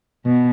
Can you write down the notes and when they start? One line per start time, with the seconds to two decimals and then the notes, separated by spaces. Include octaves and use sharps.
0.25 B2